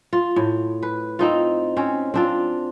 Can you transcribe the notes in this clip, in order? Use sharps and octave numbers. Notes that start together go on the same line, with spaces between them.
F4
A2
B4
C4 D#4 F4
C4 C#4
C4 D4 F4